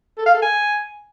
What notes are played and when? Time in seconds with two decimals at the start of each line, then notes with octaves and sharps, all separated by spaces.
0.18 A4
0.26 F5
0.34 A4
0.42 G#5